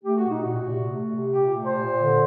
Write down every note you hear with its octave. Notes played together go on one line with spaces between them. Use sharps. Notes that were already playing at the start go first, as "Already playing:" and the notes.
A3 G4
F#4
A#2 D#4
A#2 F#4
C3
A3
C3
A#2 G4
A3
C5
A#2
D3